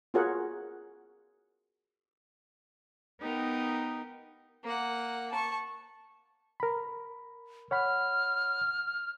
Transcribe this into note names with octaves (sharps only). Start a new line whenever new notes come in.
F4 F#4 G#4 A#4 C#5 F#5
B3 D#4 G4 A#4
A#3 F#5
A5 C#6
A#4 B5
C#5 F#5 B5 F6